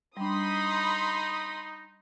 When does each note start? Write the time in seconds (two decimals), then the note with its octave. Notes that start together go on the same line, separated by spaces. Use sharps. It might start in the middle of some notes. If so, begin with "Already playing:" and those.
0.17 G3 D4 D#4 B5 C6 D#6